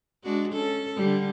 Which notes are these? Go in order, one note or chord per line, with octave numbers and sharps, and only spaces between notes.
G#3 D4 F#4
C#4 A4
D3 G3